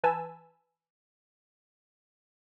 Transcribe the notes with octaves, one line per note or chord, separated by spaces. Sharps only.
E3 B4 G#5 A5 E6